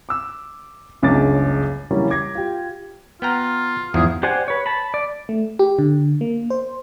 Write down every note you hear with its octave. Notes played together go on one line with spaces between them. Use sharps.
D6 E6
F#1 C#2 G2 C#5 D6 A6
C#3 E3 F#3 G3 A#3 C#4
D6 G#6 A#6
F4 G4
B3 F4 G5 A#5
E2 G#2 F3 G#4
G4 C5 D5 F#5 G#5
B4 C#5
A5 B5
D5
A3
G4
D3
A#3
C5